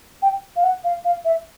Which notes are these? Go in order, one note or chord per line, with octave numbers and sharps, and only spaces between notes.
G5
F5
F#5
F5
F5
E5